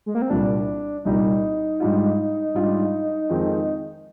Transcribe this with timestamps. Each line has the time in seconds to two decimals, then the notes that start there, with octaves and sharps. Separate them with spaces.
0.06 G#3
0.15 A#3
0.22 C4
0.30 C2 A#2 G3 D4
1.05 C2 A#2 G3 D#4
1.80 G#2 G3 D4 F4
2.54 G#2 G3 D4 F4
3.29 F2 D#3 G#3 C4 F4